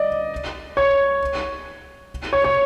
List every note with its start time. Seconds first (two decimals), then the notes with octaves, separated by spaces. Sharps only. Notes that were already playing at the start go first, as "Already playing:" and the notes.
Already playing: D5 D#5
0.77 C#5
2.33 C#5
2.44 C#5